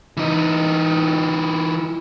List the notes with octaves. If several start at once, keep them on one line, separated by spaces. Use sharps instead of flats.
E3 D#4